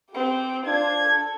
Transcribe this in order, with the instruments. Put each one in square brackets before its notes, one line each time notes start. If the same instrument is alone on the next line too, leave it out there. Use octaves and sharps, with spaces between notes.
[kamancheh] C4 G4
[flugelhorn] D4 [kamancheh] F4 C5 [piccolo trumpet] G#6
[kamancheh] A4